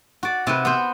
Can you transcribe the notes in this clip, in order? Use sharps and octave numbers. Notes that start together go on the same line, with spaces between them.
F#4 D5
C3 F#4 B4
B3 C5